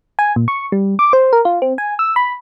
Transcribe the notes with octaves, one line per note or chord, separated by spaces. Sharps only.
G#5
A#2
C#6
G3
D6
C5
A#4
F4
C4
G#5
E6
B5